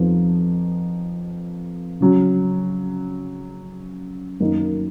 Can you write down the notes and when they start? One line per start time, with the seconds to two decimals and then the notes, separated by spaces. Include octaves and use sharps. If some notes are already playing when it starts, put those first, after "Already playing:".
Already playing: F2 F3 B3 D#4
2.01 C#3 F#3 C#4
4.40 F#2 D#3 A#3 D#4